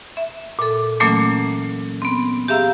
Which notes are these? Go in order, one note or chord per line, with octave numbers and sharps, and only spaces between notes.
E5
A#2 A4
A#2 E3 F#3 A3 A#3 C#4
B3 C4
G4 G#4 E5 F5 A#5 E6